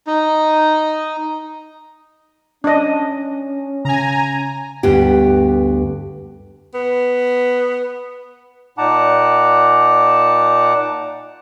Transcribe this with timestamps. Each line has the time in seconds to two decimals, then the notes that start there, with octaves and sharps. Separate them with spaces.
0.07 D#4
2.64 C#4 D4 D#5
3.85 C#3 G#5 A#5
4.83 D2 G2 B3 G4
6.74 B3
8.78 A#2 D#4 F#5 A5 A#5 D6